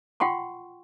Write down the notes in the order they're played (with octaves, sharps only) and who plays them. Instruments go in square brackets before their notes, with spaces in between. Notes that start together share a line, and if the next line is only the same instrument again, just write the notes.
[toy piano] F4 F#5 G5 C6 C#6